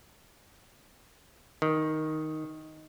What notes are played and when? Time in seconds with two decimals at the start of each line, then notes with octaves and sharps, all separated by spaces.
1.62 D#3